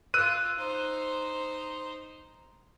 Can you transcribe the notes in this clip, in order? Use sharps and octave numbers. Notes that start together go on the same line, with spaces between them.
F4 E6 F#6 D#7
D#4 C5